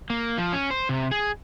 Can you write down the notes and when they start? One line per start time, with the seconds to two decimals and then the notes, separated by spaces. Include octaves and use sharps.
0.10 A#3
0.38 F3
0.53 C#4
0.71 C5
0.89 C3
1.11 G#4